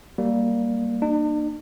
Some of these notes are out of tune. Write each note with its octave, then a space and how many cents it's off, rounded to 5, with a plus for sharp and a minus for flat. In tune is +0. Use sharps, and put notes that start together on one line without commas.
G3 +0 A#3 +0
A#3 +0 D4 +45